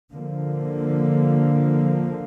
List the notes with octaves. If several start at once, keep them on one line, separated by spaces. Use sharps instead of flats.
D3 F3 A#3